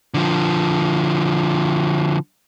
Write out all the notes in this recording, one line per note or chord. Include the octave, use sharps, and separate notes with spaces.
D3 F3